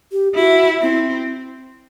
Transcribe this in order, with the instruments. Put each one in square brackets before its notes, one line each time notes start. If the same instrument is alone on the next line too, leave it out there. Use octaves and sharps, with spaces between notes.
[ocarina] G4
[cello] E4 [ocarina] F#4
[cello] C4 [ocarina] E4